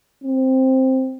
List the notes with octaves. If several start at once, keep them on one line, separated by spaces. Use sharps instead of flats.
C4